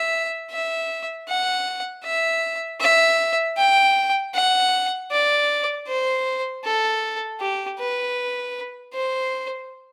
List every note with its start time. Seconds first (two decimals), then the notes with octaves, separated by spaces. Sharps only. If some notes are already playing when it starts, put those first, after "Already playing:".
Already playing: E5
0.51 E5
1.28 F#5
2.04 E5
2.81 E5
3.57 G5
4.34 F#5
5.11 D5
5.87 C5
6.64 A4
7.41 G4
7.79 B4
8.94 C5